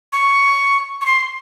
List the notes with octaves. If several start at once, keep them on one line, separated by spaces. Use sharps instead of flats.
C#6
C#6
C6